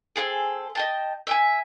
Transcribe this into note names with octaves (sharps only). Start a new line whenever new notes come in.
C4 C#4 G#4 A4
D#5 G5 A5
E5 G5 G#5